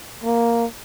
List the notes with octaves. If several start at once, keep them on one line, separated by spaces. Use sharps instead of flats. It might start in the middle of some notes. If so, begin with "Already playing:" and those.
A#3